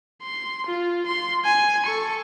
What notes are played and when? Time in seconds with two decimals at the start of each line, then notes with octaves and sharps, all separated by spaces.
0.23 C6
0.67 F4
1.07 C6
1.45 G#5
1.86 A4 C#6